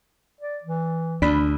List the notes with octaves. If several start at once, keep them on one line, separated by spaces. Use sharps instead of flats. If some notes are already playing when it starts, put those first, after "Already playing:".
D5
E3
D2 D4 B5